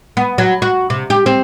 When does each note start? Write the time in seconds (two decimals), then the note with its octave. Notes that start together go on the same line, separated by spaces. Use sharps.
0.17 B3
0.38 F#3
0.62 F#4
0.90 C3
1.10 G4
1.26 C4